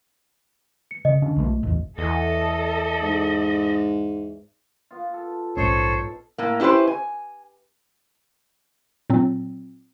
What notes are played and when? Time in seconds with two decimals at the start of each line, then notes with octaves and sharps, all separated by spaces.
0.91 C#7
1.05 C#3 D#5
1.22 D3 C#4 D4
1.36 B1 F3 A3
1.63 A1 E2
1.98 E2 A4 D#5
3.02 G#2
4.91 B3 F4
5.14 A4
5.57 A#1 G#2 C#4 D#4 A4 C5 C#5
6.38 A2 A#3
6.60 C#4 E4 G4 B4 C5
6.87 G#5
9.10 A#2 F#3 C4